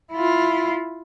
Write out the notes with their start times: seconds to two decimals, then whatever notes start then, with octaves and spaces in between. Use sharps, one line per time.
0.12 E4 F4